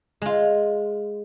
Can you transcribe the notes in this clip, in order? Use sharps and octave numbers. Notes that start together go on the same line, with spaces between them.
G#3 F4